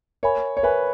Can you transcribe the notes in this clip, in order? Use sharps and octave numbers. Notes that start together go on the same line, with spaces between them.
A#4 C#5 E5 G#5 B5
C#5
A#4 B4 E5 G#5 B5